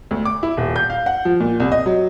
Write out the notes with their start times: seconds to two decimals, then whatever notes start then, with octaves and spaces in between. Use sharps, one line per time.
0.11 D2
0.25 D6
0.43 E4
0.57 D#1
0.76 G6
0.90 F5
1.06 F#5
1.25 F3
1.40 A#2
1.60 C2
1.72 D#5
1.86 F#3